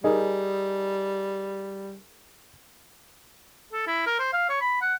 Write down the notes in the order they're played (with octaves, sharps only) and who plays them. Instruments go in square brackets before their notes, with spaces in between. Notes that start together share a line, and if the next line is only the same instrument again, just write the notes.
[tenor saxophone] G3 [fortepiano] D#4 G#4 A#4
[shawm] A4
E4
A#4
C5
F5
C#5
B5
F#5